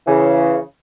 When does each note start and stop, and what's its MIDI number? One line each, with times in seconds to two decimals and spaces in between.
0.07 0.57 49
0.07 0.57 52